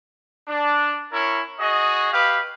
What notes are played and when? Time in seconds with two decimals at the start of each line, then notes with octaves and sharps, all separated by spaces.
0.48 D4
1.12 C#4 E4 A#4 C#5
1.59 F#4 G#4 D#5
2.13 G4 B4 F5